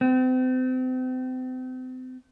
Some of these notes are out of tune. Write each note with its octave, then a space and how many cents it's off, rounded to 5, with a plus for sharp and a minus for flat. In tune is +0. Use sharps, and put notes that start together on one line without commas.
C4 -35